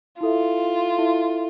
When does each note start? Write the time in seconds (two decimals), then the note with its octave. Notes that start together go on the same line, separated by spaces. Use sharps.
0.21 E4 F4 A4 E5
0.98 E4 A4 E5